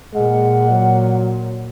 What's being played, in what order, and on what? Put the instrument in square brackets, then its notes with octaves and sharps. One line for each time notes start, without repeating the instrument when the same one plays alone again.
[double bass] A#2 [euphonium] G#3 [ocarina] F#5
[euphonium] F#3